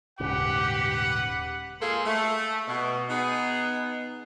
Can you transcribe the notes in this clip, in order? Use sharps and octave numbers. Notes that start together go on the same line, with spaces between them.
D#1 G#2 C#3 G4 B4 F#5
G#3 A#3 F4 G#4 A4 C5
A3
B2
B3 D#4 G#4